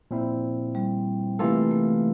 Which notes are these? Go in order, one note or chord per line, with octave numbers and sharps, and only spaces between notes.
A#2 F3 C4 E4
G3
C3 E3 A3 A#3 F4 A4
A3